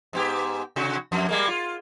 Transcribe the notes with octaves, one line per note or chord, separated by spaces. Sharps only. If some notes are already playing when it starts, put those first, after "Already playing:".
G#2 B3 G4
C3 F#4
F2
G3 G#3 A#3
F4